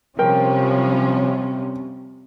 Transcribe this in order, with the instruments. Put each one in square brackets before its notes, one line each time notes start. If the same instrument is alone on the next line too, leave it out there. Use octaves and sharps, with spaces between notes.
[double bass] C3 [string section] F3 G3 C#4 [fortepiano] A#4 G5